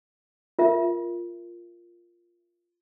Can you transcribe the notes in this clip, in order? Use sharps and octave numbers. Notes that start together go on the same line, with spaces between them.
F4 A#4 E5